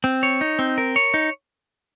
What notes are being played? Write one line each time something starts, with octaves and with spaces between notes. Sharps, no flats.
C4
C#5
D#4
C4
A#4
C#5
D#4